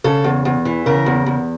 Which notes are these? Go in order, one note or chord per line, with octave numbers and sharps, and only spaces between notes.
C#3 A4
E2
E2
E3
C#3 A#4
E2
E2